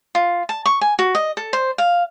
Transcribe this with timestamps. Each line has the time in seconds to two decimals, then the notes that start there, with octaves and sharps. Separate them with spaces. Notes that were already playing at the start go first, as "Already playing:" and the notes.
0.15 F4
0.49 A5
0.66 C#6
0.81 G#5
0.99 F#4
1.15 D#5
1.37 A4
1.53 C5
1.78 F5